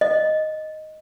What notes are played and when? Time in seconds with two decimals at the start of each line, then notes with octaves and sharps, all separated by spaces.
0.01 D#5